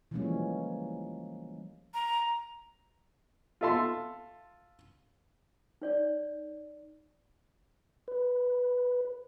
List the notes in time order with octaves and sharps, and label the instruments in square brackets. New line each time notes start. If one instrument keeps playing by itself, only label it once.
[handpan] E3 F3 G3 G#3 A#3 C#4
[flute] A#5
[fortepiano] F4 A4 E5 A5 C6
[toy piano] D#4 C#5 D5
[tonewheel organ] B4